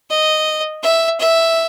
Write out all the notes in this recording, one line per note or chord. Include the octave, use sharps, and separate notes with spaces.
D#5
E5
E5